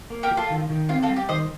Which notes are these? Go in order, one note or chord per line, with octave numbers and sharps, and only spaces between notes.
A#3
G4 A#4
F3
F4 A4
D#3
D#3
C4 F4
F4 A4
G3
G4
D#3 C5 D#5